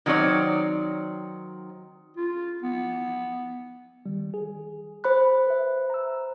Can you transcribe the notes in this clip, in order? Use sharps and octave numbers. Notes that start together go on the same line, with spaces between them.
D#3 F#3 C4 C#5 D5
F4
B3
D#3 G3
G#4
C5 B5 F#6
B4 E5
A#5 E6